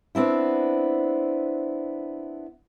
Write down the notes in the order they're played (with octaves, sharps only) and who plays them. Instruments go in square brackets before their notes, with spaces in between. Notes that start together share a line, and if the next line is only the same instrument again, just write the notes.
[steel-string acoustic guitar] B3 C4 D4 E4